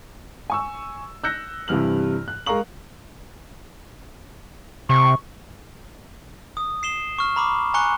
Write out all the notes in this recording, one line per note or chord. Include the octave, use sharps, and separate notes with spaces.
G#5 C#6 E6
E6 F#6 G6 A#6 C#7
G2 C3 E3 F6 F#7
F#6
G#3 A#4 F5 A#5 C#6 F#7
C3 C#6
D#6
C7 E7 G7
C#6 F6
A#5 B5 D6
G#5 A#5 C#6 F#6 C#7 G7